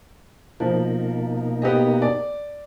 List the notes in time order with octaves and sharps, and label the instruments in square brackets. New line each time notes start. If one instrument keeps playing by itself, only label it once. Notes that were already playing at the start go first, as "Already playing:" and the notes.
[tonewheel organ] B2 A#3 D#4 [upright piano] F3
[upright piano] B3 G4 D#5
D5